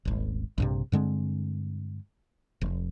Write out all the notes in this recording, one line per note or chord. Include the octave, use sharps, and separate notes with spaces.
D#1 G#1
A#1 G2 C3
G2 D3 G#3 C4
F1